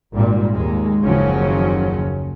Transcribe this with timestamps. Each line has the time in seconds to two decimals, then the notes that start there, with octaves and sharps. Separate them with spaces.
0.14 G#1 A#2 G3
0.53 D#2 G#3
1.02 F#1 D#2 C#3 F3 F#3 C#4